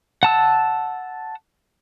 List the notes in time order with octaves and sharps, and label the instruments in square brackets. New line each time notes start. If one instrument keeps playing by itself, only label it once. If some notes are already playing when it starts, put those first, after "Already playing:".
[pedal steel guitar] F#5 A5 E6